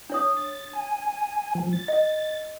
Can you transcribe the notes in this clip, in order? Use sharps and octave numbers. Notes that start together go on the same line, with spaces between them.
D4 C#5 D#6
A6
G#5
F3
A6
D#5